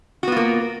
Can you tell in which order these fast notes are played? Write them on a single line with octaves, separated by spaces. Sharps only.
F#4 B3 F4 A#3